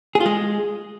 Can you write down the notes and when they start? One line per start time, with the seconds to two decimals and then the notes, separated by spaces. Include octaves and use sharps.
0.15 G#4
0.20 F4
0.26 G#3